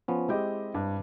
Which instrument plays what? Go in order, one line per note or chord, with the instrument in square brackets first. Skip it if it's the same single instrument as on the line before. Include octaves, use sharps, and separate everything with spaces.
[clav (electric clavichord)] F3 B3 C#4
[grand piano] G#3 G4 D#5 [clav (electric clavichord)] C4 E4 G5
[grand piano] G2